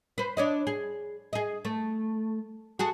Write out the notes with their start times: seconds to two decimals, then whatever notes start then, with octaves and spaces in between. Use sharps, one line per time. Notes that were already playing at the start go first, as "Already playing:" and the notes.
0.18 B4 C5
0.37 D4 C#5 D#5
0.67 G#4
1.33 G#4 D#5
1.65 A3
2.79 F#4 G#4 A4